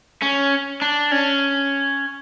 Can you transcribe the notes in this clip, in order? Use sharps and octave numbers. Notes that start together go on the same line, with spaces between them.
C#4
D4
C#4